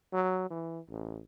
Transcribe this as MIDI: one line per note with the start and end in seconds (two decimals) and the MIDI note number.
0.13 0.46 54
0.51 0.79 52
0.91 1.21 33